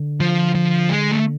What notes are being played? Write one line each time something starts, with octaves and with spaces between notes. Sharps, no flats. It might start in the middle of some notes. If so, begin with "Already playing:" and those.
Already playing: D3
F3
F3
G#3
A3